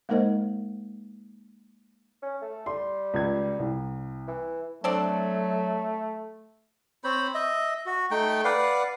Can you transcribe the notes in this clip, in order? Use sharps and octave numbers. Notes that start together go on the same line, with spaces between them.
G#3 A#3 D#4 A#4 C5 D#5
C#4
A3
G3 C6
C#2 G#6
C2
E3
F#3 A3 C4 D4 A4
C4 C5 C#5 B5
D#5 E5
F#4
A3 D#4 G5
B4 D5 F5 F#5